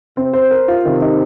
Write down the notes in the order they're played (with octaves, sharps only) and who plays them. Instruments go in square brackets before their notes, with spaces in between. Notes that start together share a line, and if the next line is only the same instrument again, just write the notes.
[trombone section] C3 [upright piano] C4
[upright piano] C5
A#4
F4
[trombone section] C3 [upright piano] D#3
[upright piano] D#4